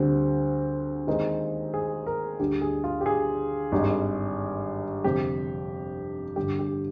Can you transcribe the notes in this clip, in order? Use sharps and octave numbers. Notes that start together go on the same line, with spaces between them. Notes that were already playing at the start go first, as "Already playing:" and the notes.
Already playing: D2 D3 G3 C4
D#2 D#3 G#3 C4
G#4
A#4
D2 D3 G3 G4
G#4
F4
G4
G#4
G#1 G2 D#3 G3
G1 F2 C3 G4
G1 G2 D3 G4
G4